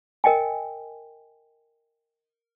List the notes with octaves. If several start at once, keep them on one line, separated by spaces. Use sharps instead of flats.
A#4 D#5 G5 G#5